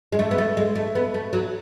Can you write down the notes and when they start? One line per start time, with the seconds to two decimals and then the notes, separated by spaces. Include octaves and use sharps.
0.12 G#3
0.19 A3
0.31 B3
0.38 A3
0.57 G#3
0.75 A3
0.95 B3
1.14 A3
1.33 F#3